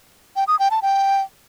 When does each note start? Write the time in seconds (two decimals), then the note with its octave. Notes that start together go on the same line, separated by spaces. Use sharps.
0.36 G5
0.48 D#6
0.59 G5
0.71 A5
0.82 G5